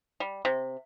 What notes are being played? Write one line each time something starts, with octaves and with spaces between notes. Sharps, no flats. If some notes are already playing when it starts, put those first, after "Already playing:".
G3
C3